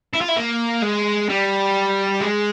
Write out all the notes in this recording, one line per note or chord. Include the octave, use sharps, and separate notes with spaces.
E4
F4
E4
A#3
G#3
G3
G#3